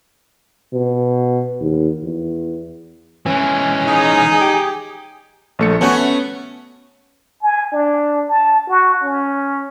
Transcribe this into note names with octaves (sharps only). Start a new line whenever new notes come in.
B2
D#2
E2
E3 G#3 C#4
D#4 G#4
G4
A#1 A3 C#7
A3 B3 C#4 F#4
G#5
D4
A5
F#4
C#4